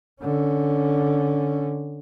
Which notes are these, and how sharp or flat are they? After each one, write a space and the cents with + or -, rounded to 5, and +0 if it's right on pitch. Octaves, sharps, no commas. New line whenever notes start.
D3 +0 C#4 +5